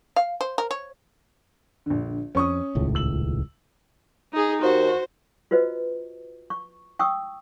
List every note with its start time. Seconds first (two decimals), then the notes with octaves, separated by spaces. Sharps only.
0.16 F5
0.41 C5
0.58 A#4
0.71 C#5
1.86 A#1 D3
2.35 F2 C#4 C#6 D#6
2.75 D#1 C#2 A2
2.95 E6 F#7
4.33 D#4 G#4
4.62 D#2 F#4 C5
5.51 F4 F#4 B4 C5 D#5
6.50 C#6
6.99 G5 C#6 D#6 E6